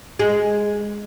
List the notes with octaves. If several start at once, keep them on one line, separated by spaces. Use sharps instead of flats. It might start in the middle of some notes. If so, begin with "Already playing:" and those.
G#3